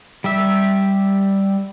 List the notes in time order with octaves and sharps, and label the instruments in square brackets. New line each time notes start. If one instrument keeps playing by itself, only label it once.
[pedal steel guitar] G3 G4 E5